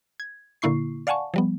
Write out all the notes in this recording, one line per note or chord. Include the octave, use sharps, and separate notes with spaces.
G#6
A#2 D3 A#3 E4 C#6 C7
D5 F5 F#5 G#5 A5 C#6
F3 G3 B3